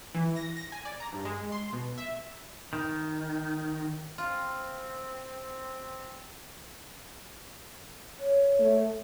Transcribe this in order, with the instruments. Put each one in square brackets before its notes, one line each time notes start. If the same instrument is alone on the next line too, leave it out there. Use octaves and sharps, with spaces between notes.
[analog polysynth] E3
A#6
A#6
G#5
D5
A#5
G2
G#3
C6
B2
E5
[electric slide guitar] D#3
[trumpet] C4 [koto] F4
[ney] C#5
[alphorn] A3